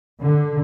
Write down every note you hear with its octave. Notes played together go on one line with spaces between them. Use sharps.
D3